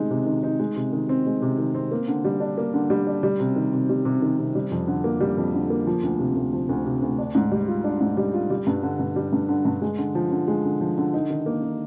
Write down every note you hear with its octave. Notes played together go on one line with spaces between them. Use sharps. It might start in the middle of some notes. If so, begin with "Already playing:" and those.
Already playing: C3 D#3 G#3 D#4
C3
D#3
D#4
G#3
C3
D#3
C4
G#3
C3
D#3
C4
A#3
D3
G3
D4
A#3
D3
G3
D4
G3
C3
D#3
C3
G3
C3
D#3
C3
G3
F2
D3
A#3
G3
F2
D3
A#3
F3
D2
C3
D2
F3
D2
C3
D2
D4
G#2
G3
F4
D4
G#2
G3
F4
G3
G2
D3
G2
G3
G2
D3
G2
G#3
D3
F3
D3
G#3
D3
F3
D3
D#4
D#3
A#3
D#3